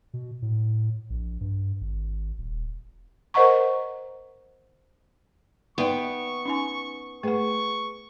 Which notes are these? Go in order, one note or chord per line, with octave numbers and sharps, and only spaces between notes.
B2
A2
A#1
G2
G#1
D#1
A#4 C5 D#5 F#5 A#5 C#6
B3 D#4 B4 D5 E5 G5 C#6
C#4 D#4 G#5
A3 G#4 B4 F#5 C#6